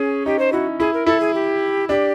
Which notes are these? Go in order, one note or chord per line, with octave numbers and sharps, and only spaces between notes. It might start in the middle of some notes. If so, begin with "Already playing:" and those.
Already playing: C#4 G#4
D#4 G4
C5
E4 F#4
E4 G#4
A#4
E4 A4
G#4
G4
D4 G4